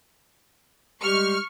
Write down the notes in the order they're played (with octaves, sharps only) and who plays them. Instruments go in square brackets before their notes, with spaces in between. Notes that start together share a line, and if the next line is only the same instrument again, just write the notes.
[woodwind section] G3 G#3 G4 [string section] C#6 F6